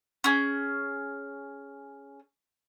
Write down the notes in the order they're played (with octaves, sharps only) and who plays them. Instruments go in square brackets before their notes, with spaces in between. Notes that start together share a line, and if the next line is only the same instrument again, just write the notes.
[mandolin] C#4 G#4